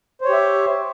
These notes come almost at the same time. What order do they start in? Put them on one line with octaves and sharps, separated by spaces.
C5 C#5 G4 E5